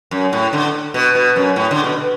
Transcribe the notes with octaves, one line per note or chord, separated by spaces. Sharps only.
F#2
A2
D3
B2
B2
F#2
A2
D3
B2